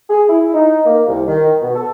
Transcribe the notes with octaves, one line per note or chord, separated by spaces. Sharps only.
G#4
E4
D#4
A#3
C2
D#3
B2
A4